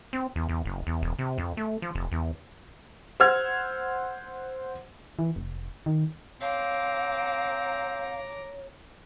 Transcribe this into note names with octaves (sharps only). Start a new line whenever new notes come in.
C4
E2
E2
F#1
E2
E1
C3
F2
A3
F3
F1
E2
C5 F#5 E6 F6 G#6
E3
F1
D#3
C4 C#5 F5 A#5 D6